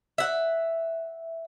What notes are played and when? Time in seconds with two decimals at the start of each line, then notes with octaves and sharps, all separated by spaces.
0.18 E5 F#5